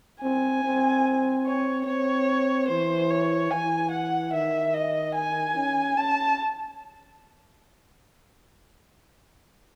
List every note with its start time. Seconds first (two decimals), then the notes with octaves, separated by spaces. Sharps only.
0.22 C4 G#5
0.64 C4
1.46 C#5
1.86 C4 C#5
2.68 E3 C5
3.10 C#5
3.51 E3 G#5
3.91 F#5
4.32 D#3 E5
4.74 D#5
5.15 G#5
5.55 C#4
5.97 C#4 A5